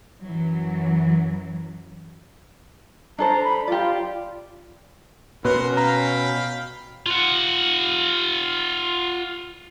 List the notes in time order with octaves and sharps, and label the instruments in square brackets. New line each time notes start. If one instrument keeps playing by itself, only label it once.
[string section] F#2 E3 F#3
[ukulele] D4 A4 C5 [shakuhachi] A#5
[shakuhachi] B5
[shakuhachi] F4 [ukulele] G4 D5
[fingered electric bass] B2 [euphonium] C#4 [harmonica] A#4 F#5 C6 [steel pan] B4
[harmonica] F5 G5 B5 [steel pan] A#5
[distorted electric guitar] F4 F#5